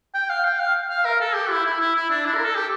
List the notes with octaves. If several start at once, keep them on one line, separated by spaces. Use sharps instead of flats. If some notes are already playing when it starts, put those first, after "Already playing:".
G5
F5
G5
F5
F5
A#4
A4
G4
E4
E4
E4
E4
D4
E4
A#4
A4
G4